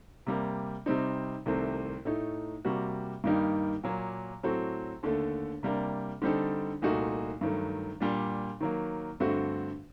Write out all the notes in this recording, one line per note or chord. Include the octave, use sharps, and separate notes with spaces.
C3 G3 A#3
C3 G3 C4 D#4
C2 C3 D#3 A3 C4
A2 A3 D#4
C3 G3 A#3 F#4
G2 D#3 G3 A#3 D#4
A#2 F#3 A#3
A2 F#3 C4 F#4 A4
D#2 D3 A3
C3 G3 A#3 D4
D3 G3 C4 D#4 A4
C2 A#2 A3 D#4 F#4
G2 D#3 F#3 A3
A#2 G3 D4
D#3 F#3 A#3
G2 D3 A3 C4 F#4